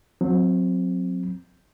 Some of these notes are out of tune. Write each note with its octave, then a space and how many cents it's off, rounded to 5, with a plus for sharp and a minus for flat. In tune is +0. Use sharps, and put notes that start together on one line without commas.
F#3 -25 C4 +0